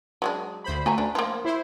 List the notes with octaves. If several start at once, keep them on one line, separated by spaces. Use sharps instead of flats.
F#3 G#3 D4
D2 C5 B5
A3 F#4 G#5 A#5
D4
F3 A#3
E4 C5